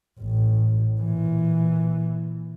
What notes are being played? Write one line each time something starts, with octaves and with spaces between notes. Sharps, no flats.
A1
A#2 E3